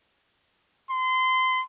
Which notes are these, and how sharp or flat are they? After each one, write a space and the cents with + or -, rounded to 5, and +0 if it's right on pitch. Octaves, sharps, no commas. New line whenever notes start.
C6 -25